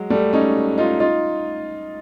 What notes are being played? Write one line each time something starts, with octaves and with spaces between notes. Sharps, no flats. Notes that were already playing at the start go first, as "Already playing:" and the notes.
Already playing: F#3 G#3
G3 A3
C#4 D#4
D#4 F4
D#4 F4